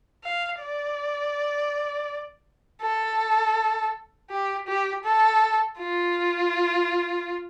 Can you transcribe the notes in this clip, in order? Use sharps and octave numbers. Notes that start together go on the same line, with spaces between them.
F5
D5
A4
G4
G4
A4
F4